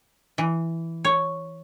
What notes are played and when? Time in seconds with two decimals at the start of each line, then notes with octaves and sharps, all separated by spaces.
0.38 E3
1.05 C#5